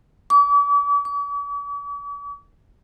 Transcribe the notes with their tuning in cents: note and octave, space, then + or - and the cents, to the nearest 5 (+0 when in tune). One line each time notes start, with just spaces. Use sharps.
D6 -40
D6 -45